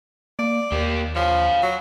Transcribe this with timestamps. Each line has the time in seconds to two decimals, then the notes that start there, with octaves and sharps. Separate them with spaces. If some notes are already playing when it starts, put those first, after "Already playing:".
0.39 A#3 D5
0.72 D#2 A#3 G4
1.16 F3 C#5 F5
1.63 F#3